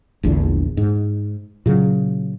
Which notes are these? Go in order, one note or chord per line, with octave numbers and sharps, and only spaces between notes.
E1 A#1 E2 D3
G#2
A#2 C#3 F#3